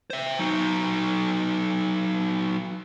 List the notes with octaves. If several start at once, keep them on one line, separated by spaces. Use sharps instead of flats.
C5 E5
F#3 D#4